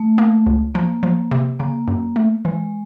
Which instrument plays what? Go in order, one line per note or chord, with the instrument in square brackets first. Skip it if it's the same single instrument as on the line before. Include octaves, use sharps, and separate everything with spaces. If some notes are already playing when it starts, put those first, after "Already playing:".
Already playing: [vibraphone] A3
[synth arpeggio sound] A#3
C#2
[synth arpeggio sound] F3 [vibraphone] A#3
[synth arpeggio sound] F3
C3
[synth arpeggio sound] C#3 [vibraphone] A#3
[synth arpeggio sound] F#2
A3
[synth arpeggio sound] E3 [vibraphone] G#3